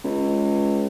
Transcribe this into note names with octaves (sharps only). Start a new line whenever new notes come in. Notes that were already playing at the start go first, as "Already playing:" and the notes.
C#2